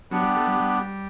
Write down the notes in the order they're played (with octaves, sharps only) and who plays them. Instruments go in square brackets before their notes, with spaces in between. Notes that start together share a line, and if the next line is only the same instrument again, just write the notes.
[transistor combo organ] F#3 [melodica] B3 D4 G4
[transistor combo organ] G3
A3
G3
G3